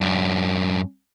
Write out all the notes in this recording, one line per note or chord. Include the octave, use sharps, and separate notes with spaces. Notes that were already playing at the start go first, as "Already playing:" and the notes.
F#2 D4